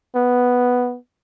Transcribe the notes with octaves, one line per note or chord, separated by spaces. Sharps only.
B3